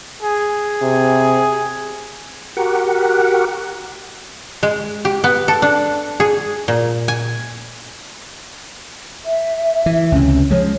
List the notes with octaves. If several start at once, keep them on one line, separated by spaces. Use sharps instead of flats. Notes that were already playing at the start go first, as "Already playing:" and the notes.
G#4
C3
F#4 G4 A#4 F#5
G#3
G4
B3
A4
D4
G#4
A#2
G#5
E5
E3
C#2 C3 C#4
F3 G#3 C#5